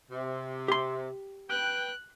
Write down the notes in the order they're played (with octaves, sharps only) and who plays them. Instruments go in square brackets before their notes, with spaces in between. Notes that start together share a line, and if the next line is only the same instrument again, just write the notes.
[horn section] C3
[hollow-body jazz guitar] G4 C6
[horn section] B4 G5 [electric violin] F#6